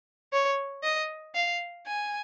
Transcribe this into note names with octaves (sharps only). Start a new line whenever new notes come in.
C#5
D#5
F5
G#5